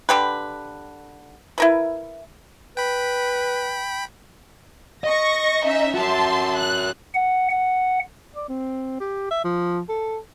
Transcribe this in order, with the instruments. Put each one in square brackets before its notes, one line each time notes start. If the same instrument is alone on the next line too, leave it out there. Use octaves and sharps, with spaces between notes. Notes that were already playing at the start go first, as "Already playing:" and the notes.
[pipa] D3 G4 B4
E4 A#4 B4
[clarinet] B4 [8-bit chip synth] G5 B5
[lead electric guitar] D#5 [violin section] C#6 A#6
[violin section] C#4 D#4 E5
[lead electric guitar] F#4 A#4 [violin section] E5 A5 C6
[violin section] F#6
[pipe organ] F#5
F#5
[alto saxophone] D5
C4
G4
E5
F3
A4